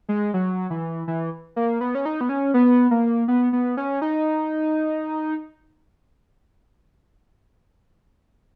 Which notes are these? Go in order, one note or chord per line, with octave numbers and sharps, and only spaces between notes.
G#3
F#3
E3
E3
A#3
B3
C#4
D#4
B3
C#4
B3
A#3
B3
B3
C#4
D#4